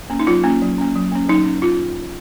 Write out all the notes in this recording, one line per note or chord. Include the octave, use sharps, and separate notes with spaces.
A#3 C#4
D#4
F#3 F4
A#3 C#4
F#3
A#3 C#4
F#3
A#3 C#4
F#3 D#4
C#4
F4